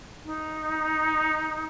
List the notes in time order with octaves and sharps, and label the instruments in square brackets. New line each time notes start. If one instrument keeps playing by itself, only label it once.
[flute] D#4